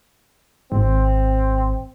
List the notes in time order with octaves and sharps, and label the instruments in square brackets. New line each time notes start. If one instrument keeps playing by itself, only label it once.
[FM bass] G#1 [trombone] C4